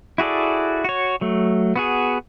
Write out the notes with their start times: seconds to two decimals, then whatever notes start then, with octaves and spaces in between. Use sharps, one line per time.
0.18 E4 F#4 G#4 A4 D5
0.84 F#4 C#5
1.21 F#3 A3
1.76 B3 F#4 G#4